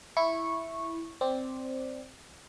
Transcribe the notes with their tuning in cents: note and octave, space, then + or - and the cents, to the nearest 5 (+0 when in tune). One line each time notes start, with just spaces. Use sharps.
E4 +0 C#6 -10
C4 +0 D5 +0